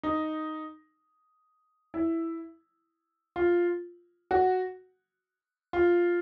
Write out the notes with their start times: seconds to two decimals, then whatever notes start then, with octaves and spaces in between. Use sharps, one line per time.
0.03 D#4
1.94 E4
3.36 F4
4.31 F#4
5.73 F4